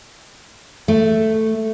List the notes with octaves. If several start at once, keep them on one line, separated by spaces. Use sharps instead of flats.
A3